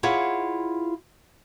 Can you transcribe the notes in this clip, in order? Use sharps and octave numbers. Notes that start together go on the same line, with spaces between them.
E4 F4 G#4 C#5 F#5